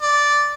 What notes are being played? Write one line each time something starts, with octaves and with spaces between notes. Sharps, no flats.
D5